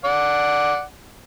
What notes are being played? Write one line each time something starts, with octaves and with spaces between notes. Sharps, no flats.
D5 F#5